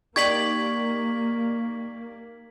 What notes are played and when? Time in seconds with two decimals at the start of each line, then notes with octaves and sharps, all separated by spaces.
0.16 A#3 D#4 G4 D5 C#6 G#6 B6 F#7